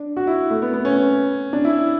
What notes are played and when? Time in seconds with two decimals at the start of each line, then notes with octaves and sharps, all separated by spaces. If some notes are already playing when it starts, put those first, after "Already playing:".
Already playing: D4
0.17 F#4
0.27 E4
0.50 A3
0.62 B3
0.74 B3
0.85 C#4
1.53 D4
1.65 E4